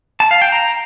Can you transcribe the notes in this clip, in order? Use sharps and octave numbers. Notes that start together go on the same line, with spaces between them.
A5
F5
G5
A#5